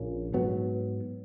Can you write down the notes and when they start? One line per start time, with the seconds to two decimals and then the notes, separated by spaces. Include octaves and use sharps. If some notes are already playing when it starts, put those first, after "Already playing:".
Already playing: A#1 A#2 A#3 C#4
0.34 G#2 F#3 B3